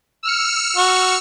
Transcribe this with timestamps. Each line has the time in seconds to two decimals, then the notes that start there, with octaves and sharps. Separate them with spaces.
0.23 E6 F6 C#7
0.77 F#4